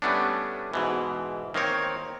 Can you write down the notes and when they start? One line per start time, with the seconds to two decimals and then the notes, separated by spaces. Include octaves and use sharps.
0.02 G3 A3 B3 C#4 D4
0.73 G#2 B2 E3
1.54 D#3 A#3 C4 C#5